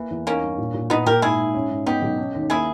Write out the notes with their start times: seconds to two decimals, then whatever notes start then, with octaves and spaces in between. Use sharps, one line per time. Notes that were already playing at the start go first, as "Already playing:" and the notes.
Already playing: E3 A#3
0.11 E2
0.26 A#3 C#4 D#4
0.42 G2
0.58 A#2
0.74 A#2
0.90 A#2 B3 D#4
1.06 A#2 G4 A#4
1.22 G#2 E4 G#4
1.39 G#2
1.55 C#4
1.70 G#2
1.86 B3 D#4 G4
2.02 B1
2.18 C#4
2.35 D#2
2.50 A#3 E4 G#4